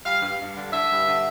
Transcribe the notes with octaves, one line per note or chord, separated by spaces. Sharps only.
G3 F5
G2
G2
D3
D3 E5
G2
D3